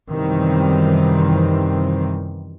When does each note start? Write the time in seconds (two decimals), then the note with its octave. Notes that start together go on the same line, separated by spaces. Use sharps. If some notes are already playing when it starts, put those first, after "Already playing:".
0.10 F#2 C3 D#3 E3 G3 C4